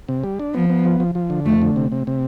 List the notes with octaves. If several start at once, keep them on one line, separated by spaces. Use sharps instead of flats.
C3
G3
D4
F3 B3
B3
F3
F3
F3
D3
F2 A3
D3
C3
C3
C3